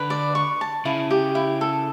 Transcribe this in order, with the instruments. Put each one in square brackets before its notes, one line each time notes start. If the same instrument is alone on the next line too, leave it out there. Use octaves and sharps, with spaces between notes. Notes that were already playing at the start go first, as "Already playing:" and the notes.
Already playing: [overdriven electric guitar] D3 [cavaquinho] B4
[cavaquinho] D5
C#6
A5
[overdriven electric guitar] C#3 [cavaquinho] E4
[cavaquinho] G4
E4
A4